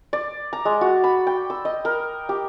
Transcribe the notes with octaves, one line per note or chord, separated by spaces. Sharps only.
D5
A#5
G#3
F#4
B5
G5
E6
D#5
A#4
G4